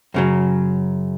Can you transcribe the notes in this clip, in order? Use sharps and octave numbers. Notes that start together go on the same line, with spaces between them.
F#2 C#3 F#3